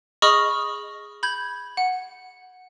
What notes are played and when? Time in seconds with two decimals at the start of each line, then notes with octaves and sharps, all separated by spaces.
0.22 G#4 D#5 B5 C#6 D#6 F6
1.23 B5 G6 G#6
1.77 F#5